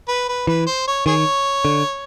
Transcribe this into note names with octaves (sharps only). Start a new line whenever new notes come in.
B4
B4
E3 B4
C5
C#5
D#3 G#4 C#5
D3